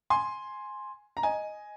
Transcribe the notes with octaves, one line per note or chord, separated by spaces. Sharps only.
G#5 C6
A#5
D#5 G#5